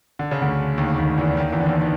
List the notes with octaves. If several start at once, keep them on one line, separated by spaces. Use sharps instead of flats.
D3
C#3
D2 D3
D#2 D#3
D#2 D#3
E2 E3
D#2 D#3
E2 E3
D3
D#2 D#3
D#3